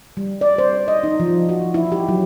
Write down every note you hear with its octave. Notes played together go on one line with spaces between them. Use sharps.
G3
D5
C5
D#5
D#4
F3
F#4
E4
G4
F#3